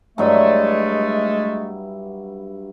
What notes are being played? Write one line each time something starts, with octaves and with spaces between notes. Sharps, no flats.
G2 F#3 G#3 A3 E4